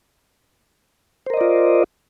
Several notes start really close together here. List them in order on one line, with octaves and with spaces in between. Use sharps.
C5 A#4 D#5 D5 F4